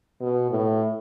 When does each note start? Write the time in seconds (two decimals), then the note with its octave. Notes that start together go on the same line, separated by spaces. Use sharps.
0.21 B2
0.51 A2